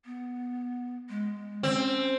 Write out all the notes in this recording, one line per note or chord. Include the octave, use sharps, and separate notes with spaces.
B3
G#3
C4 C#4